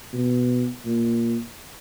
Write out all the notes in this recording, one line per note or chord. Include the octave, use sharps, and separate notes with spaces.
B2
A#2